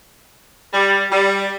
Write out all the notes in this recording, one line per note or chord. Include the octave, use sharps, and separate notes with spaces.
G3
G3